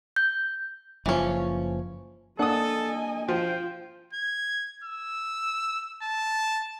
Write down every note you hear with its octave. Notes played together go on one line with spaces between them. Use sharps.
G6
F#1 E3 F3 C#4
A#3 D4 A4 D#5 F#5 G#5 D#6
F3 F4 C5 G5
G#6
E6
A5